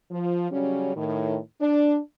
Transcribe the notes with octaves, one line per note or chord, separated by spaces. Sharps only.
F3
C#3 F#3 G3 C#4
A2 D#3
D4